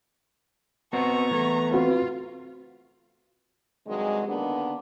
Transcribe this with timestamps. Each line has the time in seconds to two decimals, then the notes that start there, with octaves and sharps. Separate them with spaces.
0.93 B3 C4 F#4 A#5 C#6
1.31 E3 A3 B3
1.73 C4 F4 F#4 B4
3.87 G2 C3 D#3 F#3 G#3
4.28 D3 D#3 A#3 B3 D4